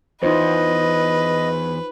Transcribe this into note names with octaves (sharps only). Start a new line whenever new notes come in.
E2 D#4 F4 B4 C5 D#5